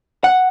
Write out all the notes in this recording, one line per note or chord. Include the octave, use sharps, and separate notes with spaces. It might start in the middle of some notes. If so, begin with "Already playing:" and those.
F#5